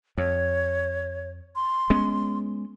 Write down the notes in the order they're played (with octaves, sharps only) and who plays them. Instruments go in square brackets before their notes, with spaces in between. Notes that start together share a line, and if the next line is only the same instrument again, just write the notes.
[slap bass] F2 [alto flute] C#5
[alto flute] C6
[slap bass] G#3 B3 C#4